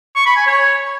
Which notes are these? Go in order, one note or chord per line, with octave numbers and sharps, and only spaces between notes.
C#6
B5
G#5
C#5